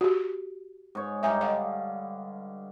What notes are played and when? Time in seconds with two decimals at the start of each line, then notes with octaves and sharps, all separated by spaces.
0.01 F#4 G4
0.95 G#2 C#5
1.23 G2 D#4 E5 G#5
1.41 D3 D#5 F5